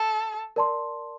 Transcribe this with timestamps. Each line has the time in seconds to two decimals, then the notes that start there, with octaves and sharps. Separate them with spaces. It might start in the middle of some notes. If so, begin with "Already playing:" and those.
Already playing: A4
0.56 A#4 D5 A5 C6